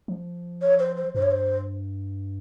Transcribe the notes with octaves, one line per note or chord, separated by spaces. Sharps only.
F3
C#5
C5
C5
G2 C5
C#5
C5